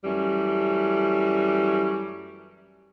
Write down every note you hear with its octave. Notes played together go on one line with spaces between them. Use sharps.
F#2 E3 G3 A3 C#4